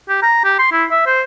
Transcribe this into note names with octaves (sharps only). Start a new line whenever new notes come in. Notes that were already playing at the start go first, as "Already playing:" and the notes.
G4
A#5
G4
C6
E4
E5
C5